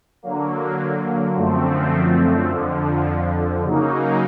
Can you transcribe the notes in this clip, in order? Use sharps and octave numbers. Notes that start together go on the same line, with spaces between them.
D3 F#3 A#3
F#2 D3 F3 A3 C4
F2 D3 F3
C#3 F#3 A#3 D#4